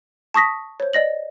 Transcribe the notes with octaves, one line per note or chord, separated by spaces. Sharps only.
A5 C#6 D#6 A#6 B6
C5 C#5
D5 D#5 A#6 F#7